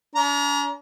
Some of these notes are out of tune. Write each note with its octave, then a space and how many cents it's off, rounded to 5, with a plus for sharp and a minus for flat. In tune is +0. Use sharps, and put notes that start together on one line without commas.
D4 -45 A#5 +20